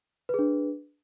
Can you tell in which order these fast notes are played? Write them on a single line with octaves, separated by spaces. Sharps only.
B4 G#4 D4